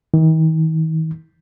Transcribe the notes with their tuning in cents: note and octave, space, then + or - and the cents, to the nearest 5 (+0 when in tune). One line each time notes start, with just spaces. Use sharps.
D#3 +40